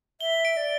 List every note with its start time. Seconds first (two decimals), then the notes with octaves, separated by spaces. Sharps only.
0.21 E5 G7
0.45 D7
0.57 D5